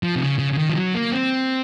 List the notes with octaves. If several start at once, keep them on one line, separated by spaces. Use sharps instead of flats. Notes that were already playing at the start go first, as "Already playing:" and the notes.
F3
C3
C#3
C#3
C#3
D#3
F3
F#3
A#3
C4